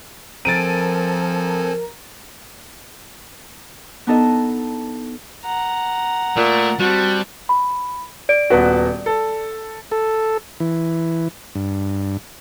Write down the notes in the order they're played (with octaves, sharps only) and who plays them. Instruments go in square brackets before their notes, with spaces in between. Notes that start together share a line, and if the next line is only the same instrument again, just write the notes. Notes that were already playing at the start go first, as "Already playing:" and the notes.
[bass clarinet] F3 [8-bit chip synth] C4 A4 G#5 [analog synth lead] A#4 [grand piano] A6 D7 D#7
[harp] B3 D4 D#4 A4 D#5
[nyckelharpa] F#5 A#5
[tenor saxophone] A#2 [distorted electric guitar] A3
[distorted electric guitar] G3 [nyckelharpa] C4 A5 [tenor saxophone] F#4
[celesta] B5
D5 D7
[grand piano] D#1 B3 F#4
A4
[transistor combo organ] A4
E3
G2